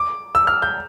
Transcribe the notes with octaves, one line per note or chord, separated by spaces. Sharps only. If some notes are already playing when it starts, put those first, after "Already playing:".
Already playing: D6
E6
F6
G6